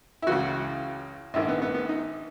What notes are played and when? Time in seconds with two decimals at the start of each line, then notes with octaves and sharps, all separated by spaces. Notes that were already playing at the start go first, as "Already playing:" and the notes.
0.22 E4
0.27 C#2 C#3 E3 F#4
1.34 A#1 G#2 D#3 E4
1.48 B3
1.62 B3
1.74 B3
1.89 D#4